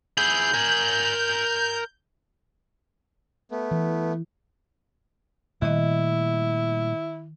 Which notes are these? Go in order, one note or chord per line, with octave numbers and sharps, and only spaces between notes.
E4 G#4 G6
A#4 G#5
A3 B3
E3
A#2 D#3 G3 A3 E4 D#5